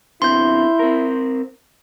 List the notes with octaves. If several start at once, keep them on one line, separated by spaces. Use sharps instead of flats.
D3 B3 C4 E4 C6 G6
C4 A#4